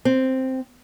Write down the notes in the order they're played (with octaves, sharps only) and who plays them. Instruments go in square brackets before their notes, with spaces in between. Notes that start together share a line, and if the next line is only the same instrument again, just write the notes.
[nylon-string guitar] C4